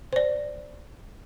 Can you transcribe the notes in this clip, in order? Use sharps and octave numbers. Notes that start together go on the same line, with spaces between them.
C5 D5